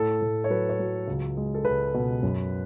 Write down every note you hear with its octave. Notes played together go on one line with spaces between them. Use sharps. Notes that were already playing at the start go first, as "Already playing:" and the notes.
Already playing: A2 A4
A2
C#5
F#3 B4
C#5
F#3
C#2
G#3
A4
C#2 B4
B2
F#2